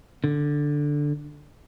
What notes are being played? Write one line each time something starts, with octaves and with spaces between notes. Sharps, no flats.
D3